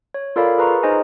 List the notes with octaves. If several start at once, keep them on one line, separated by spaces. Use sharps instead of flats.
C#5
F4 A4 A#4 D5 F5 B5
G#4 B4 A#5 C6 C#6
D#4 G#4 C5 D#5 G#5